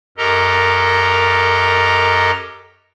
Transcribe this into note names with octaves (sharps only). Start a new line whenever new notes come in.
F#2 G4 A4 A#4 D#5 A#5